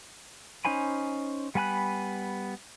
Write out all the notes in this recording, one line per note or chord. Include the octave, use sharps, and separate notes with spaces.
C#4 D#4 C5 G#5 B5
G3 B3 G#5 B5 F#6